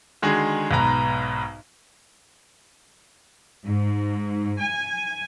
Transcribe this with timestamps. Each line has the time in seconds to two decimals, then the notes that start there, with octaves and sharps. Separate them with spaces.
0.22 D3 D#3 G#3 F#4 G#4
0.71 B1 G#2 B2 B4 A#5
3.66 G#2
4.59 G#5